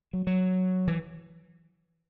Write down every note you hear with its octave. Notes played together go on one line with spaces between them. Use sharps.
F#3
F#3
E3